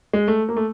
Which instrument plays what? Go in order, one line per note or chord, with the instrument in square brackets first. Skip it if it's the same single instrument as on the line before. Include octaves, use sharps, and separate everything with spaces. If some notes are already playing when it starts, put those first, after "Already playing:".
[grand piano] G#3
A3
A#3
A3